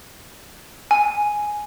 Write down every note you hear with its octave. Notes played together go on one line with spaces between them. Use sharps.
G#5